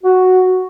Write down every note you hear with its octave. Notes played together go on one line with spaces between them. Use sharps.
F#4